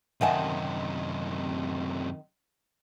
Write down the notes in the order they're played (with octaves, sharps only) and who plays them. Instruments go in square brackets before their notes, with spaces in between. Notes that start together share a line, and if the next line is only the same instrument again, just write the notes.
[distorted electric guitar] F#2 C3 [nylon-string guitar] D#3 D#5 A5 [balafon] E5 F#5 G#5